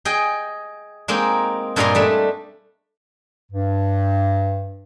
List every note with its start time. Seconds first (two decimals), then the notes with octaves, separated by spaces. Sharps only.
0.05 G#4 D#5 G5
1.08 G#3 A#3 C4 D#4
1.76 G2 A#2 G#3 D#5 A#5 C6
1.95 G3 A3 D4
3.52 G2